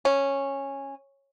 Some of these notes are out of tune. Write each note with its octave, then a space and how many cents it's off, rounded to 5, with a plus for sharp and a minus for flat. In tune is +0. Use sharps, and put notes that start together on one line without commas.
C#4 -10